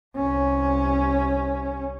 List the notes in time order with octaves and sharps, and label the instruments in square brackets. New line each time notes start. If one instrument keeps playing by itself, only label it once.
[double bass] C2 C#4